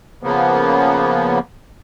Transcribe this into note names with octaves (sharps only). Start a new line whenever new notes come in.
C#3 F3 A#3 B3